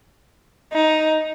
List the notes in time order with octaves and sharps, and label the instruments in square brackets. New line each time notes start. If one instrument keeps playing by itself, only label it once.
[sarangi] D#4